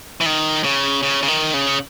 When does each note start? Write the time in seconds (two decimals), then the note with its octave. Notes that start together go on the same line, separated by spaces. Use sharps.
0.21 E3
0.26 D#3
0.64 C#3
1.03 C#3
1.23 C#3
1.28 D#3
1.54 C#3